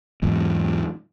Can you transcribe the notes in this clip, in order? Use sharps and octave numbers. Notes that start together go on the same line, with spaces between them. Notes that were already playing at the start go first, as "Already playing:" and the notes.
E2 G#2